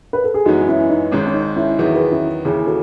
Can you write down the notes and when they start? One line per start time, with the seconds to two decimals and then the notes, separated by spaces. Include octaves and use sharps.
0.13 B4
0.24 A4
0.34 G#4
0.46 F#2 E3 G#3 B3 D#4 F#4
0.68 C#4 E4
0.90 D#4
1.12 G#1 G#2 D#3 C#4
1.27 C#4
1.34 D#4
1.56 C#4 E4
1.78 E2 D#3 F#3 B3 E4 G#4
1.95 G#4 B4
2.11 C#4 E4
2.45 D#2 C#3 E3 E4 G#4
2.66 F#4 A4